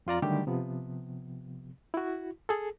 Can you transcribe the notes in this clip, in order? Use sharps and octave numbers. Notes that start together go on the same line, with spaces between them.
F2 F4 D5 A#5
D3 D#3 F#3 G3 A3 G4
C3 F3 B3
E4 F#4
G#4 A4